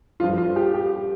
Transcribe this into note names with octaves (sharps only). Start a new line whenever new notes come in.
G2 F3 F4
F4
G4
G4